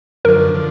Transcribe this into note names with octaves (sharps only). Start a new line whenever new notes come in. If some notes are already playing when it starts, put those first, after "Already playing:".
F#2 D3 F3 A#4
D3 F3